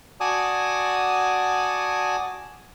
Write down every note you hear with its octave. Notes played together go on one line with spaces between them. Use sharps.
F#4 D5 G#5 A5 D#6